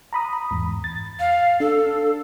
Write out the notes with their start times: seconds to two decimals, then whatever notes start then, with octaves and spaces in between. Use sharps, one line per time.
0.13 A#5 B5 D#6
0.51 E2 G#2
0.84 A6
1.20 F5
1.60 D4 A4